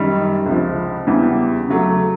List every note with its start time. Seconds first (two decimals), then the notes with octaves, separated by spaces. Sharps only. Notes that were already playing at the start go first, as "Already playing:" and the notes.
Already playing: F#2 D#3 G3
0.46 C#2 C3 F3
1.07 E2 C#3 E3 G3
1.68 C#3 F#3 A3